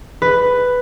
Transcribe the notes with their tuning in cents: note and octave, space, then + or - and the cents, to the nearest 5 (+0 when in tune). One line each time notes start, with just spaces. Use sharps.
B4 +5